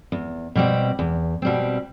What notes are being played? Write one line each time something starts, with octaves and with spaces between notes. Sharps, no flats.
E2
B2 G3 C4
E2
B2 G3 C4